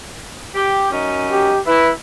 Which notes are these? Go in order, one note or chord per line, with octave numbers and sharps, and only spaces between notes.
G4
F#2 C#4 D#4
G4
E4 B4